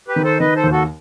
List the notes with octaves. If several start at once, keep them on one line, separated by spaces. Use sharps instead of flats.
G4 B4
D#3
A4 C5
D#3 B4 D#5
A4 C5
D#2
F#4 A4